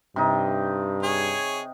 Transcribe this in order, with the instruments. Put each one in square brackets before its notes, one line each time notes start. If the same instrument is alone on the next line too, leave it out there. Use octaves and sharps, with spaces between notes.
[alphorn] G2 [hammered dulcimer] C3 D#4
[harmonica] G#4 C#5